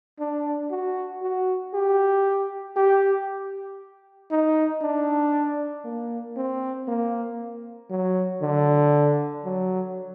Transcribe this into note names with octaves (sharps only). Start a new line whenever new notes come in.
D4
F#4
F#4
G4
G4
D#4
D4
A#3
C4
A#3
F#3
D3
F#3